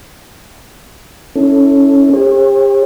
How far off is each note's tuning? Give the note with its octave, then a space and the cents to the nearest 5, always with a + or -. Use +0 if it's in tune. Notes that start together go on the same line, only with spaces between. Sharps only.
C#4 +0 E4 -35 A4 +0
G4 +40 C5 +45